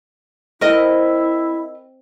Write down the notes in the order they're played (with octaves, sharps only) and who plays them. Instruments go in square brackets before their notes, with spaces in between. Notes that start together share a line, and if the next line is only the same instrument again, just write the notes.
[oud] C4 [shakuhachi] E4 [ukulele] A#4 D#5